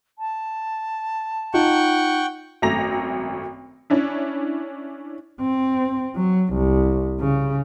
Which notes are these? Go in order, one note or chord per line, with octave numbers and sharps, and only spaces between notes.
A5
D#4 F4 F#5 G5 C#6
G#1 F#2 A3 A#5 A#6 F7
C#4 D4 E4
C4
F#3
C2
C#3